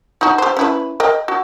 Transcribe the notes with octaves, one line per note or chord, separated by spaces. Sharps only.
D#4 F#4
G4 C5
C#4 E4 B4
A#4 D#5 G5
F#4